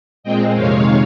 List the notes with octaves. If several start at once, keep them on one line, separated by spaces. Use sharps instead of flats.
A#2 G#3 C4 D#5 G5
F2 C3 D#3 G#3 C#5 F5